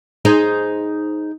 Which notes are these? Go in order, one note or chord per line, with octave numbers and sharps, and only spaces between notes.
D#4 G#4 C5